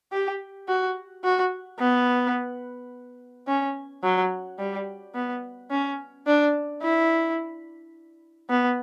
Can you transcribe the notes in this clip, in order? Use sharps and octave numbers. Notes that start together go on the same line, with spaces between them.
G4
F#4
F#4
B3
C#4
F#3
G3
B3
C#4
D4
E4
B3